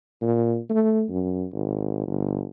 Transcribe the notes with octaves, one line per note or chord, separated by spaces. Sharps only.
A#2
A3
F#2
G#1
G1